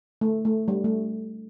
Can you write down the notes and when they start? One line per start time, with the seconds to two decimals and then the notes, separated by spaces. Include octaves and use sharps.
0.21 A3
0.45 A3
0.68 G3
0.84 A3